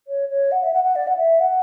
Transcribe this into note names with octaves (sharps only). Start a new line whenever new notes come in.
C#5
C#5
F#5
E5
F#5
F#5
D5
F#5
E5
F#5